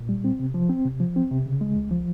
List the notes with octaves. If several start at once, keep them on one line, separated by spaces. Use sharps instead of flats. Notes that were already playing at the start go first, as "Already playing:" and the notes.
Already playing: A#2
G3
C4
C3
F3
C4
C3
F3
C4
C3
C#3
G#3
C#2
F3